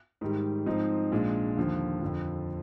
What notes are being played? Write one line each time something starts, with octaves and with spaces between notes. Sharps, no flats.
G#2 D#3 G3
G#2 F3 C4 D#4
A#1 A#2 G#3 D4
D#2 D3 F3
F2 D3 F3